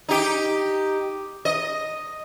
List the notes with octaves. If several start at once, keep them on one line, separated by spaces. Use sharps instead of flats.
D#4 G4
D#5